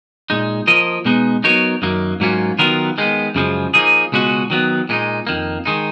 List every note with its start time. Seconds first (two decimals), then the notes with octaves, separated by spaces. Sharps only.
0.30 A#2 G#3 D#4
0.67 F3 A#3 F4 A#4 D#5
1.05 B2 G#3 B3 D#4
1.44 F#3 B3 D#4 A#4 C#5
1.82 F#2 D#3 F#3 A#3
2.20 G#2 F#3 A#3 C#4 F4
2.58 D#3 F#3 B3 F4 A#4
2.98 D#3 G#3 B3
3.35 F#2 C#3 F3 G#3
3.74 F3 A#3 D#4 G#4
4.12 C#2 B2 G#3 C#4 F#4
4.50 D#3 F#3 B3
4.89 A#2 G#3 B3 D#4
5.27 F2 D#3 A#3
5.66 D#3 G#3 D#4